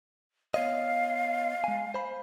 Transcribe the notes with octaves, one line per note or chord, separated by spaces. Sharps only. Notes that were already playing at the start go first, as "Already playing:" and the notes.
B3 C#5 D#5 F5
G#3 G#5
C5 B5